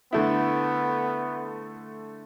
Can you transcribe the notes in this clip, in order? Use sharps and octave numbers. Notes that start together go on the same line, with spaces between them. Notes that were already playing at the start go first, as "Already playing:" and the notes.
D3 A3 B3 E4